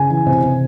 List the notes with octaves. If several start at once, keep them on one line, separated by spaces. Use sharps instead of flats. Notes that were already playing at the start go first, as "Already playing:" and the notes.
Already playing: C#3 G#5
E3
C3
C3